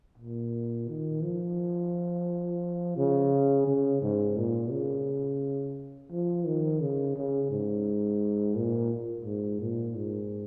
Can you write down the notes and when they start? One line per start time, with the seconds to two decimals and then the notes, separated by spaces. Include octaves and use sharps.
0.18 A#2
0.89 D#3
1.23 F3
2.97 C#3
3.67 C#3
4.02 G#2
4.37 A#2
4.71 C#3
6.12 F3
6.46 D#3
6.81 C#3
7.16 C#3
7.51 G#2
8.56 A#2
9.25 G#2
9.60 A#2
9.95 G#2